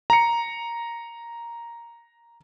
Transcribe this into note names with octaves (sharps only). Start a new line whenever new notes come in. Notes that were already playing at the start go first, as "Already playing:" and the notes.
A#5 C#7